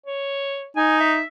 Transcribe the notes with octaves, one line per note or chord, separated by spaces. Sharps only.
C#5
D#4 G#5
E5